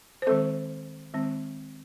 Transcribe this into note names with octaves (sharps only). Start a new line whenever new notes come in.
C5
D#3 G#3 C4 A4
D#3 G#3 C4